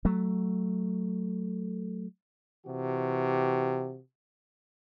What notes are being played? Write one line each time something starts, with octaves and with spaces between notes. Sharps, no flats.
F#3 A3
C3 E3 F#4 G4